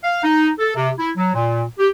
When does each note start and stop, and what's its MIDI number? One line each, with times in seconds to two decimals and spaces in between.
0.03 0.23 77
0.24 0.48 63
0.59 0.72 69
0.75 0.89 48
0.98 1.10 64
1.16 1.31 54
1.34 1.62 46
1.79 1.88 67